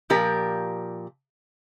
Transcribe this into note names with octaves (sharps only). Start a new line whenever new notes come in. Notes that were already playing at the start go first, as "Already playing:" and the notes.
A#2 F3 G4 A#4 D5